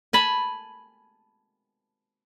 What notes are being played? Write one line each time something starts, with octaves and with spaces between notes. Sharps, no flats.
G#5 A5 B5